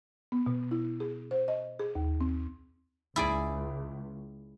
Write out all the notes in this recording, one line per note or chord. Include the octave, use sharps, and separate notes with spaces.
B3
B2
E4
G#4
C5
D#5
G#4
D#2
C4
C#2 E4 G#4 D5